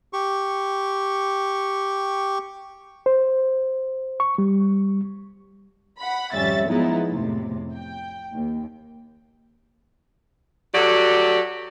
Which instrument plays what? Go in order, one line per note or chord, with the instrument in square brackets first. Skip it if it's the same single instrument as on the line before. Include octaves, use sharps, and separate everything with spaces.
[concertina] G4 C#6
[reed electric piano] C5
C#6
G3
[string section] F#5 B5
G#1 F2 G3 C#4 E5 A6
F3 F#3 G#3 B3 D#4 E4
F2 A2 C3
G5
D#2
[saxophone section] F#3 F#4 G4 A4 D5